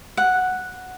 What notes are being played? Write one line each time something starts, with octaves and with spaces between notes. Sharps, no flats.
F#5